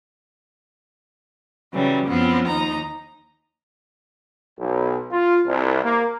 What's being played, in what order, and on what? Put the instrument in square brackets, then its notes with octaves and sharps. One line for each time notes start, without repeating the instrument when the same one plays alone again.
[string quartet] C#3 E3 F#3 G3
F#2 F3 B3 C4
D#2 D#4 A#5
[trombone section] B1
F4
C2
A#3